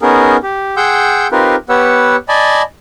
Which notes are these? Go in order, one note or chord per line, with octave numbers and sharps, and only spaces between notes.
B3 C#4 D#4 G#4 A#4
G4
G#4 F#5 G5 C6 E6 G6
C4 D#4 F4 G4 A#4 B4
B3 G4 B4 C#5 F#5 E6
D5 D#5 G#5 A5 B5